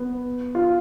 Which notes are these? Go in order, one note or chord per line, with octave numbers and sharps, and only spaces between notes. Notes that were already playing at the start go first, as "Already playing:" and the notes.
Already playing: B3
F4